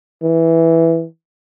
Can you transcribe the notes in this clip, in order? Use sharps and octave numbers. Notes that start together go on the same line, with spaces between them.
E3